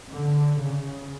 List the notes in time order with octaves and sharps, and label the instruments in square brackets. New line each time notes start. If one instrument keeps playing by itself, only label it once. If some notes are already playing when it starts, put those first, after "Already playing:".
[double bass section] D3
C#3